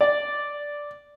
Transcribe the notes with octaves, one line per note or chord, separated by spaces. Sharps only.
D5